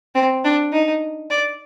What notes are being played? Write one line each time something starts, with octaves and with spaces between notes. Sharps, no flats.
C4
D4
D#4
D5